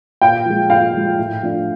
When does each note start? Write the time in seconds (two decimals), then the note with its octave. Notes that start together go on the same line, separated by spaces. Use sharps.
0.21 A#2 F5 G5
0.45 F3 G#3
0.70 A#2 F5 G5
0.94 F3 G#3
1.18 A2
1.43 F3 A3 D4